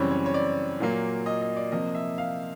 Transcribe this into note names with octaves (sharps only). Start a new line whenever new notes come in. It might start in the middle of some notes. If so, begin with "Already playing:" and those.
Already playing: F#2 C#3 E3 G3 C4 C#5
C#5
C#5
D5
A#2 F#3 A#3
D#5
D#5
D5
C3 F3 A#3 D#5
E5
F5